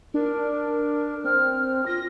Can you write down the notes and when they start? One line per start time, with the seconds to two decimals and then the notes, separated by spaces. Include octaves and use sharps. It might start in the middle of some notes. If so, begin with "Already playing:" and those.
0.14 D4 A#4
1.24 C4 F6
1.86 F4 A#6